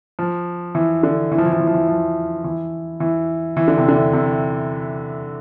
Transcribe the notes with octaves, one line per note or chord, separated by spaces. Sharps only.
F3
E3
D3
E3
F3
E3
F3
E3
F3
E3
F3
E3
E3
E3
D3
C3
D3
C3